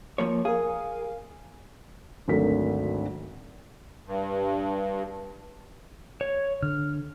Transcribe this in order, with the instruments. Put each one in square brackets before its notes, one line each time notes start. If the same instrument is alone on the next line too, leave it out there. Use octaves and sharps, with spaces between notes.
[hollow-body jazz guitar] F3 A#3 C#5
[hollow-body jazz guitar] G#4 [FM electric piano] A#4 F5
[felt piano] G#1 D2 F#3 A4 A#4 B6
[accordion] G2
[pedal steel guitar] C#5
[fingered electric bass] D3 [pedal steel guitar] F6